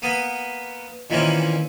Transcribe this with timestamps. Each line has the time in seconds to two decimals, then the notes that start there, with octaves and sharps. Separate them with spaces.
0.02 A#3 B3 D#6
1.10 A#2 D#3 E3 A#3 C4 C#4